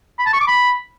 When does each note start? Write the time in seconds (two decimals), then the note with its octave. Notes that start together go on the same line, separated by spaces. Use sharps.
0.19 B5
0.26 A5
0.33 C#6
0.40 D6
0.48 B5